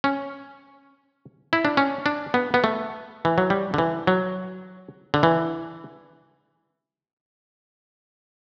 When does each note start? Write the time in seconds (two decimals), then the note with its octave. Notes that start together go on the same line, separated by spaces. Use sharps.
0.04 C#4
1.53 E4
1.65 D4
1.77 C#4
2.06 D4
2.34 B3
2.54 B3
2.64 A3
3.25 E3
3.38 F#3
3.50 G3
3.74 D3
3.78 E3
4.07 F#3
5.14 D3
5.23 E3